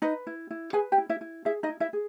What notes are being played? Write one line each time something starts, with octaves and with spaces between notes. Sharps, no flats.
D#4 B4 D#5
E4
E4
G#4 B4 G#5
G4 G5
E4
E4 E5
E4
E4 G#4 E5
D#4 D#5
E4
E4 E5
G#4